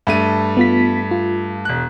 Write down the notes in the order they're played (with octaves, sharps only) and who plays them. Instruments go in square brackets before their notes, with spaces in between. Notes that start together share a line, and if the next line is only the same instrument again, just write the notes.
[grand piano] G2 A3 D#7
[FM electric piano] B3 F4 B6
F4
[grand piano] E1 F#6